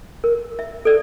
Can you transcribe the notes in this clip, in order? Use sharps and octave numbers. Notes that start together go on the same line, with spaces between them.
A#4
E5
A4 D5